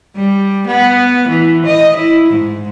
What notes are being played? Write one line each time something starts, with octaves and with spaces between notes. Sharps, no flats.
G3
B3
E3
D#5
E4
G#2